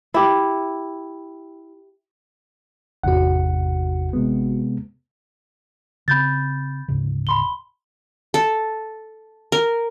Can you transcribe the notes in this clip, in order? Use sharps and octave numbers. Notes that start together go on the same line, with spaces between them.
E4 G4
G#1 E2 C3 F#4 F#5
C3 G#3 B3
C#3 C4 B5 G6 A6
D1 G#2 C#3
B5 C6 G7
A4
A#4